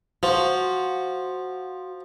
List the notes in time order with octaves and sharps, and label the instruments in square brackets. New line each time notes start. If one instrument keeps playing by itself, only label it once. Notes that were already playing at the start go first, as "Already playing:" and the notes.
[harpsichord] F3 [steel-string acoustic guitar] F#4